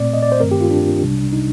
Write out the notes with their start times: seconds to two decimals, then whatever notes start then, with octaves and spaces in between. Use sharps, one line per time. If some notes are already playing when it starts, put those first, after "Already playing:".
Already playing: A#2 A3 C4 D5
0.14 D#5
0.23 D5
0.32 C5
0.40 G2 D#3 A3 C4 A#4
0.51 G4
0.61 F4
0.71 D4
1.02 C2 C3 G3
1.33 D#4